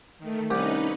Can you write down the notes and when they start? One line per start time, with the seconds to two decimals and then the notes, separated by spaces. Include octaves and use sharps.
0.19 D#3 A3
0.50 C2 C#4 D#4 G4 B4